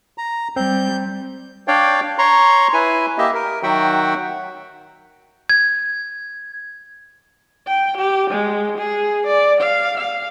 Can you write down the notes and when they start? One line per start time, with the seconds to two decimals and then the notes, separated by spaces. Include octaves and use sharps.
0.18 A#5
0.56 G3 C4 G6
1.68 D4 C#5 D5 F5 G5
2.19 C#5 A#5 C6 C#6
2.74 E4 B4 G#5
3.18 A#3 G4 D#5 E5
3.34 A#4
3.63 D#3 F#3 F#4 E5 F#5 G5
5.50 G#6
7.68 G5
7.98 G4
8.30 G#3
8.78 G#4
9.27 D5
9.61 F5
9.97 F5